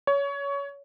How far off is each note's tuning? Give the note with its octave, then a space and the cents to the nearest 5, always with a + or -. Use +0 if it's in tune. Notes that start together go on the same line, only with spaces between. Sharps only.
C#5 +20